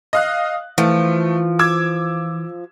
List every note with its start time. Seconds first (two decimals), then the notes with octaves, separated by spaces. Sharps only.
0.13 D#5 F5 F#6
0.78 E3 F3 A3
1.59 D6 E6 G#6